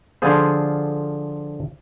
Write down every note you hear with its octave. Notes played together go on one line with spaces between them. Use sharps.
D3 F3 F4 G#4 C5